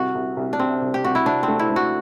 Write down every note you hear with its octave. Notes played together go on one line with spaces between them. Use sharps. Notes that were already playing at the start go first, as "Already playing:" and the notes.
Already playing: C2 F#4
C2
C2
D4
C3 C4
C2
G4
C2 F#4
E4
C3 D4
A3 C4
E4
A3
F#4